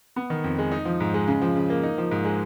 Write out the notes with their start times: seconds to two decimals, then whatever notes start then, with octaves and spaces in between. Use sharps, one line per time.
0.16 B3
0.30 D#3
0.44 F2
0.59 G#3
0.72 D#4
0.85 F3
1.00 G#2
1.14 G#3
1.27 C#3
1.42 F3
1.56 C#3
1.70 A#3
1.83 D#4
1.98 F3
2.11 G#2
2.25 G#3